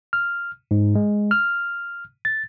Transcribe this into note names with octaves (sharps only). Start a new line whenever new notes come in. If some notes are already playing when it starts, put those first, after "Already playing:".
F6
G#2
G#3
F6
A6